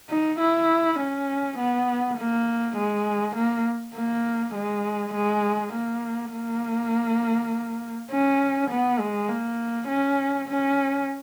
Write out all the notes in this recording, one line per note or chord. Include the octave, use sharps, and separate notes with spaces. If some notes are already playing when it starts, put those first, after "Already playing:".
D#4
E4
C#4
B3
A#3
G#3
A#3
A#3
G#3
G#3
A#3
A#3
C#4
B3
G#3
A#3
C#4
C#4